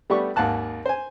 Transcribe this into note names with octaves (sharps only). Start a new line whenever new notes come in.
G3 A3 B3 D4 G4 C#6
G#1 D#2 F5 F#5 A5 F#6
C5 G#5